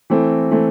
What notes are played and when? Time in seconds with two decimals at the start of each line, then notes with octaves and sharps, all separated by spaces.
0.10 E3 A3 C4
0.51 E3 A3 C4